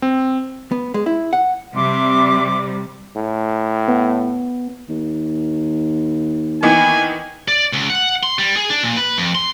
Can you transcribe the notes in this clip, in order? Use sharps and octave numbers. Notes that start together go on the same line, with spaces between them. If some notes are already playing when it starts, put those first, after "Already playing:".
C4
B3
G#3
E4
F#5
C3 G3 E5 C6 D6
A2
B3
D#2
D#3 E3 B3 G#5
D5
C#2
F#5
C6
G3
G#4
D4
A#2
B4
F2
C6